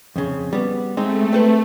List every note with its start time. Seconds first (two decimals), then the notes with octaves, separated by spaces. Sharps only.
0.16 F2 C#3
0.53 G3 B3
0.97 G#3 A3 C4 D#4
1.33 C4 A4 B4